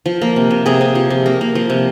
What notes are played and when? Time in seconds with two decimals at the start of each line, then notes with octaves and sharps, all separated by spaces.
0.06 F3
0.22 A#3
0.36 C3
0.50 C3
0.66 C3 G#4
0.81 C3
0.95 F3
1.10 C3
1.26 A#3
1.41 A#3
1.55 F3
1.70 C3